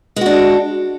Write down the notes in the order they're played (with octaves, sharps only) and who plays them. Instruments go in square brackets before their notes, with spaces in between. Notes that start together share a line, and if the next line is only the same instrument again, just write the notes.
[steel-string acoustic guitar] G#3
F#4
D4